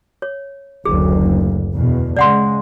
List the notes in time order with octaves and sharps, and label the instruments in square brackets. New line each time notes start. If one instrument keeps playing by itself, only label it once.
[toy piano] C#5
[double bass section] F#1 D2 [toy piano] G#4
[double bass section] E2 B2
[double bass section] C#3 G#3 [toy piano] D5 F#5 C6